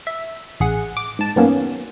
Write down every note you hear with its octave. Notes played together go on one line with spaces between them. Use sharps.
E5
A1 G#4 F#5
D6
G#2 A5
F#2 D#3 F#3 A#3 B3 C#4